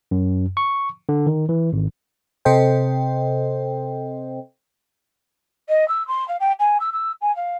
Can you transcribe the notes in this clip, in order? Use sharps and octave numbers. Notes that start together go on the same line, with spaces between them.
F#2
C#6
D3
D#3
E3
G#1
C3 C4 A4 C5 D#5 G5
D#5
E6
C6
F5
G5
G#5
E6
E6
G#5
F5